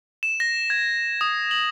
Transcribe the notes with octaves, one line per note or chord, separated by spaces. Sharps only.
E7
A#6
G#6
D#6
F#7